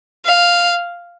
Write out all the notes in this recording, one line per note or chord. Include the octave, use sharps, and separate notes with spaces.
F5